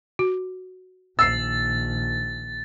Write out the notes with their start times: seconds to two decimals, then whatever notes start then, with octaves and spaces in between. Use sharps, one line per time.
0.19 F#4
1.19 A#1 D#3 E6 A6 C7